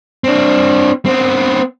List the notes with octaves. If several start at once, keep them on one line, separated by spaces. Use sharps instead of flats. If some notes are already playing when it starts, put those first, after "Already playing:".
C4 D4
B3 C4